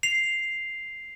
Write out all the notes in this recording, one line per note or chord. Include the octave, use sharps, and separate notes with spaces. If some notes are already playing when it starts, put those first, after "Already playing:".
C7 F7